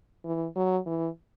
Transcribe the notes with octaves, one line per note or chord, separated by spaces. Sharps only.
E3
F#3
E3